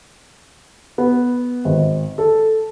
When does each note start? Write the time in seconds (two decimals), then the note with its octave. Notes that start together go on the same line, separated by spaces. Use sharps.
0.98 B3
1.65 G#1
2.18 A4